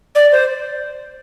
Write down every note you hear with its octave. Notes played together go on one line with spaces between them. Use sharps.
D5
C5